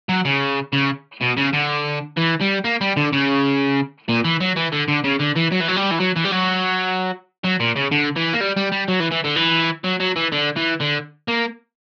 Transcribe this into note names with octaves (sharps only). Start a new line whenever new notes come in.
F#3
C#3
C#3
B2
C#3
D3
E3
G3
A#3
G3
D3
C#3
A#2
E3
F#3
E3
D3
D3
C#3
D3
E3
F#3
E3
F#3
G3
E3
F#3
E3
G3
F#3
F#3
A#2
C#3
D3
E3
A#3
G3
G3
G3
F#3
E3
E3
D3
E3
F#3
F#3
E3
D3
E3
D3
A#3